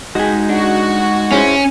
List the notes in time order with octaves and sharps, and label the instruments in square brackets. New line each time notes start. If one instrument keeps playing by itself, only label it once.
[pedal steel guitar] G#3 D#4 [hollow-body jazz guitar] F#4 G#4
[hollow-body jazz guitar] D4 [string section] F#4 F#5
[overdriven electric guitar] C#4 [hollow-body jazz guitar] E4 G#4 C5